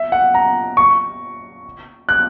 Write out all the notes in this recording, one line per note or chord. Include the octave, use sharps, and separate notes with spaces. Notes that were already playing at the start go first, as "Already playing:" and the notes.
Already playing: E5
F#5
A#5
C#6
F#6